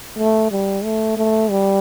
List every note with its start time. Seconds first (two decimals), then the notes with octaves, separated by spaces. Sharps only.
0.19 A3
0.51 G3
0.84 A3
1.17 A3
1.50 G3